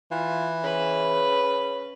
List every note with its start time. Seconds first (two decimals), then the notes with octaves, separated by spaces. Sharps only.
0.11 E3 F4
0.64 C#3 B4